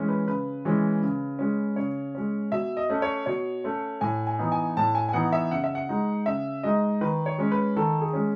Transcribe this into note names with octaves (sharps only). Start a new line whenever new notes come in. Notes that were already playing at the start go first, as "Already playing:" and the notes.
Already playing: E3 G#3 C#4
B4
C#3 B4
E3 G#3 C#4
C#3
G#3 C#4
C#3 C#5
G#3 C#4
B2 E5
D#5
A3 C#4
C#5
B2 C#5
A3 C#4
A2 G#5
G#5
E3 B3 D#4
G#5
A2 A5
G#5
G#5
E3 B3 D#4 F#5
E5
C#3 F#5
E5
F#5
G#3 D#4
C#3 E5
G#3 D#4 D#5
D#3 B4
C#5
G#3 C#4
B4
D#3 A4
G#4
G#3 C#4